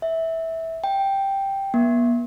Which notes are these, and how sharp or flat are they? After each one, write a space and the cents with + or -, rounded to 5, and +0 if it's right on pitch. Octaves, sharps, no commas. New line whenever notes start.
E5 -15
G5 +0
B3 -45